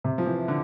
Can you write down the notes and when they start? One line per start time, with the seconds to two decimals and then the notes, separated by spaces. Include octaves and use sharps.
0.04 C3
0.18 F3
0.26 E3
0.48 D3